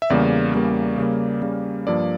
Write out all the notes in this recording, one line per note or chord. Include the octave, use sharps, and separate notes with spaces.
E5
E2 C#3 G3 A#3 D5
E2 C#3 G3 A#3
C#3 G3 A#3
C#3 G3 A#3
G2 F3 A#3 D5